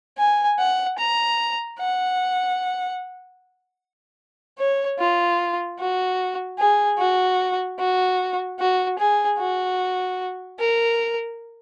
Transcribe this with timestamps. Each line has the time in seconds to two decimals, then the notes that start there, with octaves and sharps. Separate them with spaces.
0.18 G#5
0.59 F#5
0.98 A#5
1.79 F#5
4.59 C#5
4.99 F4
5.79 F#4
6.59 G#4
6.99 F#4
7.79 F#4
8.59 F#4
8.99 G#4
9.39 F#4
10.59 A#4